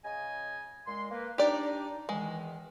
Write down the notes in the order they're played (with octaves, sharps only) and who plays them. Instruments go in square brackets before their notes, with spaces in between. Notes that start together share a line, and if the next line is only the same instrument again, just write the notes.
[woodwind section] C#3 D#5 G#5
A#2 G#3 C6
A#3 B4
[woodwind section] D4 D#4 [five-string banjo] G4 D5
[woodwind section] E2 D#3 E3 [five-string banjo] G#3